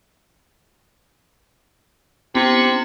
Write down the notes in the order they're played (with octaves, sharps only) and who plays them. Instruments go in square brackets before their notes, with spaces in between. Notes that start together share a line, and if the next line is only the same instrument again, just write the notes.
[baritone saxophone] C3 [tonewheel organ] B3 C#4 E4